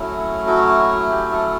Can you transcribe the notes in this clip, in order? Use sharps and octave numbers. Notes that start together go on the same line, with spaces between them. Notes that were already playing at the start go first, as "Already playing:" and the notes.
Already playing: F#3 A3 C#4 E4
F#4
G4
A4